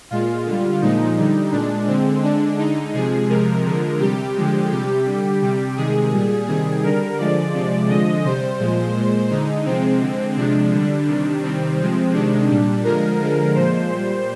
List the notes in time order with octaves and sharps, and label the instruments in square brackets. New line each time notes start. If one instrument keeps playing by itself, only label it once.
[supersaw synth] A#2 G#3 F4
D3 G3
A#2 F3 G#3 D#4
D3 G3
A#2 G#3 D4
D3 G#3 C4
D3 G#3 D4
D3 G#3 D#4
C3 F3 G#3 G#4
C3 F3 G#3 A#4
D3 F3 G#3
C3 G3 G4
D3 F3 G#3
C3 G3 G4
D3 G3
C3 G3
C3 D#3 G#3 G#4
A#2 G3
C3 D#3 G3 G#4
D3 G3 A#4
D3 F3 G#3 D5
C3 F3 G#3
D3 F3 G#3 D#5
C3 G3 C5
A#2 F3 G#3
A#2 G#3
D3 G#3 D#4
C3 F3 G#3 C4
D3 G#3
C3 F3 G#3 D4
D3 G3
C3 D#3 G3
C3 D#3 G3 C4
C3 F3 G#3
C3 D#3 G#3 D4
A#2 G3
D3 F3 G#3 A#4
D3 F3 G#3
A#2 F3 G#3 C5
A#2 G3